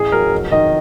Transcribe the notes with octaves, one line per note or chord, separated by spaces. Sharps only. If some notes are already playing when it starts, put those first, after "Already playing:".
Already playing: A1 G#4
F#3 A#4
F1
D#3 D#5